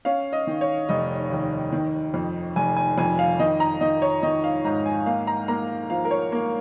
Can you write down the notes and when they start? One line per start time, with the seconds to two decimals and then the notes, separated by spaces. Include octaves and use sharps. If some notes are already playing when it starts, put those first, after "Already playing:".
0.05 C#4 F5
0.33 D#5
0.47 D#3
0.61 C#5
0.89 F1 D#5
1.31 D#2
1.72 D#3
2.14 F2
2.56 F1 G#5
2.76 G#5
2.98 F2 G#5
3.19 F5
3.39 D#3 D#5
3.60 A#5
3.81 D#3 D#5
4.02 C#5
4.23 D#3 D#5
4.44 F5
4.64 G#2 A#5
4.86 G#5
5.06 A#3 F5
5.27 A#5
5.48 A#3 A#5
5.90 F3 F5
6.05 A#4
6.11 C#5
6.32 A#3 A#4